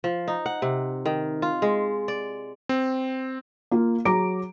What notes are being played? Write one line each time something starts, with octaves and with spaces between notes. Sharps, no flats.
F3
D#4
F#5
C3
D#3
F4
G#3
D5
C4
A#3 F4
F#3 G#4 A#5 D6 D7